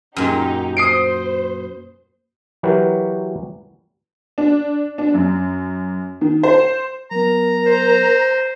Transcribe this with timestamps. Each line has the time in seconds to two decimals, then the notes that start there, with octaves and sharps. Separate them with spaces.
0.16 F#2 A#2 D#4 G4
0.77 C5 D#6 C7 D7
2.63 E3 F#3 F#4 G4 A#4 B4
4.38 D4
4.98 D4
5.14 F#2
6.21 D#3
6.43 C5
7.11 F#3 B3 A#4 A#5
7.66 C5